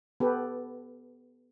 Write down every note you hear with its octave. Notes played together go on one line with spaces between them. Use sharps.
B3 G4 A4 B4